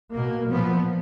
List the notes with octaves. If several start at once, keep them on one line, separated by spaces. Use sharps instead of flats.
B2 A#3
A#2 F3 B3